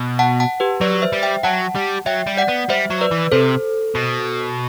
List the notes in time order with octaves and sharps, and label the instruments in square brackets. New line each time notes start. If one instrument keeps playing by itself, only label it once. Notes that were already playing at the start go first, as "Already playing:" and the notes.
Already playing: [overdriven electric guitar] B2
[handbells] F#5 A5
F#5 A5
G4 B4
[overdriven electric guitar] F#3 [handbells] B4 D5
[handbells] C5 E5
[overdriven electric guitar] G3
[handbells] E5 G5
[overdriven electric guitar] F#3 [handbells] F#5 A5
[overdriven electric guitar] G3
[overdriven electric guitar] F#3 [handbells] E5 G5
[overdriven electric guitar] G3
[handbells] D5 F#5
[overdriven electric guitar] B3
[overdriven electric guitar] G3 [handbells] C5 E5
[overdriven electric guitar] F#3
[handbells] B4 D5
[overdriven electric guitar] E3
[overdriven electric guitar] C3 [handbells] A4 C5
[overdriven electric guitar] B2